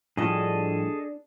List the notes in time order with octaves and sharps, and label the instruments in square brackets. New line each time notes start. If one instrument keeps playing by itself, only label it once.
[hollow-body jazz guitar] A2 F3 G3 [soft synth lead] D4 [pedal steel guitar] G#4 A4 D#5